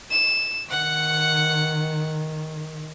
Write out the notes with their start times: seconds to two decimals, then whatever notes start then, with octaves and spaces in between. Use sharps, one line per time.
0.11 E7
0.70 D#3 F#5 C#7